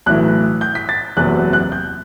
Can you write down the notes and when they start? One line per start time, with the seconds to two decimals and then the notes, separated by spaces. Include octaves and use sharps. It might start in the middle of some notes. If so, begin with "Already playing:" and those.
0.06 B1 A2 E3 F#6
0.61 G6
0.75 B6
0.89 A6
1.17 F#1 E2 C3 F#3 F#6
1.53 F#6
1.72 G6